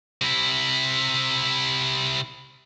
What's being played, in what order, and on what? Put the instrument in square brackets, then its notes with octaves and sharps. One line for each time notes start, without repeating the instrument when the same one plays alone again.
[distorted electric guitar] C3 E4